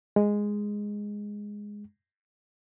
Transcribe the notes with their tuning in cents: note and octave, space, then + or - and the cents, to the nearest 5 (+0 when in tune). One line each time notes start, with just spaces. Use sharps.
G#3 -5